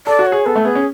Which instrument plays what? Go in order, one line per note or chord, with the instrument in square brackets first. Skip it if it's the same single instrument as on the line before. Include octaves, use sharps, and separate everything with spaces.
[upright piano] A4 [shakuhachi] D5
[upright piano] F#4
[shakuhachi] C#5
[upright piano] G#4
[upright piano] B3 [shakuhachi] A4
[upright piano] A3
[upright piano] B3 [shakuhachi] G#4
[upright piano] C#4